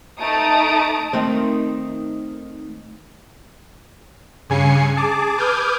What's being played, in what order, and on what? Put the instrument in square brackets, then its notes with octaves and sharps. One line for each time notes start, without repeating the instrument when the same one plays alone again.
[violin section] A3 D#4 A5 A#5 D#6 D7
[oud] D#3 A3 C4
[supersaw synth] G2 C#3 G#5 C7 C#7
G#4 A5 D6
B4 D6 D#6 F6 G6 G#6